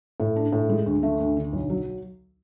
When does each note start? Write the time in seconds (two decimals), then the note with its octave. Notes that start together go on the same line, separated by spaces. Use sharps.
0.20 A2
0.36 D4
0.53 A2
0.69 G#3
0.86 D2
1.03 A3
1.20 D2
1.37 D3
1.53 B1
1.70 F#3